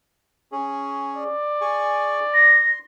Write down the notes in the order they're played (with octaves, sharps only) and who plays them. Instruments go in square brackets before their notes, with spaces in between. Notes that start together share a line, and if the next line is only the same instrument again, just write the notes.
[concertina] C#4 G#4
[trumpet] D5
[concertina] G#4 G#5 C#6
[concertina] C6 [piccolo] A#6